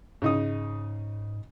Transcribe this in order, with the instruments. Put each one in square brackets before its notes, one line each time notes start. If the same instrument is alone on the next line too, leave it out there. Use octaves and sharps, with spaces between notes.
[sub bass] G#2 [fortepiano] C#3 D#4 D#6